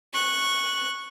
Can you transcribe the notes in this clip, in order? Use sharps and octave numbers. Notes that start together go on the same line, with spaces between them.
C#6 F#6